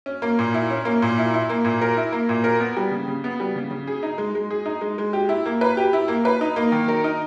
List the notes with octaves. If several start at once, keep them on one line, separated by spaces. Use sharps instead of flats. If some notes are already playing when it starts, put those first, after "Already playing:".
C#4
A#3
A#2
E4
C#4
A#3
A#2
E4
E4
A#3
A#2
A#4
E4
A#3
A#2
A#4
B3
G3
C#3
C#3
B3
G3
C#3
C#3
G#4
D#4
G#3
G#3
G#4
D#4
G#3
G#3
G4
E4
A#3
B4
G4
E4
A#3
B4
D#4
A#3
D#3
A#4
D#4